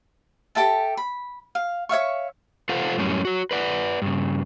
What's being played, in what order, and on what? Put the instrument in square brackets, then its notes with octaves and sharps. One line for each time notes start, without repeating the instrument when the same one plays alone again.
[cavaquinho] G4 A4 E5 A5
B5
F5
C#5 E5 F5 C#6
[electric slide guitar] F4 A4 C5 F5 F#5
F#2 A2 G3 C#4
F#4 C#5
B4 D5 F#5
G2 C#3